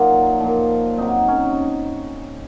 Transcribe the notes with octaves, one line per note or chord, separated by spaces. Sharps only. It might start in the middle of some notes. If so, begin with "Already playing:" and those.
Already playing: A#2 F#3 D#4 F4
A#2 F3
C3 F#3 D#4
C#4